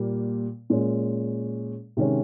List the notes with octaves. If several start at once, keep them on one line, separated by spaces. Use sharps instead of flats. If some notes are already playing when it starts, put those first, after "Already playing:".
Already playing: A#2 G3 A#3
A#2 G#3 C#4
C3 D#3 G#3 C#4